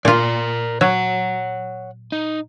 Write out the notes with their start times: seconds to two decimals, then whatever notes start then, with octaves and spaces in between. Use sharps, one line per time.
0.05 A#2 F4 A#4 D5
0.81 F#3 C#5 F#5
2.12 D#4